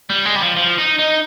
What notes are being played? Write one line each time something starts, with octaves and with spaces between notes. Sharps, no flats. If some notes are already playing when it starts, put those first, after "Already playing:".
G3
G#3
G3
F3
F3
D#4
D#4